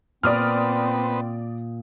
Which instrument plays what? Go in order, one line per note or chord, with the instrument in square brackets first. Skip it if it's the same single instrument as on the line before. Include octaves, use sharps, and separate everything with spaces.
[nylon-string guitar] A#2 [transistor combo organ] B3 B4 C5 [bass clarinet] C4 [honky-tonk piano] D5 D#6 F6